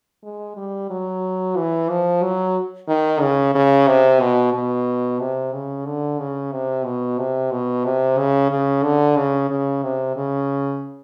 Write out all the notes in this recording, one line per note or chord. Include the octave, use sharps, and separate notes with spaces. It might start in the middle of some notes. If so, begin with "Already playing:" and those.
G#3
G3
F#3
E3
F3
F#3
D#3
C#3
C#3
C3
B2
B2
C3
C#3
D3
C#3
C3
B2
C3
B2
C3
C#3
C#3
D3
C#3
C#3
C3
C#3